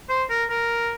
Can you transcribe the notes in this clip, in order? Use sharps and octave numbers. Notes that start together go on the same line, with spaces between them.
C5
A#4
A#4